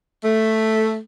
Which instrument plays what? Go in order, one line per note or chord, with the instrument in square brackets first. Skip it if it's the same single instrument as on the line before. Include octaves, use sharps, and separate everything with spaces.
[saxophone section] A3